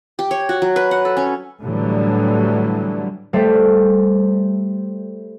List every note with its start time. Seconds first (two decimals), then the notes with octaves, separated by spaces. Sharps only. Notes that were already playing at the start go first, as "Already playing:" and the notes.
0.19 G4
0.31 C#5
0.49 F#4
0.62 F#3
0.76 B4
0.91 F#5
1.05 A4
1.17 C#4
1.62 A2 D3 E3 F#3 G3
3.33 G3 A3 C5 D5 E5